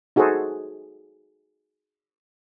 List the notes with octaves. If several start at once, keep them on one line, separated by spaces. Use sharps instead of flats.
D#4 F#4 G#4 A4 C5